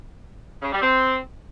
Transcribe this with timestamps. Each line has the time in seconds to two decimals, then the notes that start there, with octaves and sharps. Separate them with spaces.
0.62 C#3
0.72 G3
0.82 C4